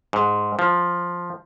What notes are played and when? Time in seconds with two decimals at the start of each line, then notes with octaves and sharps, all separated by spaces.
0.13 G#2
0.59 F3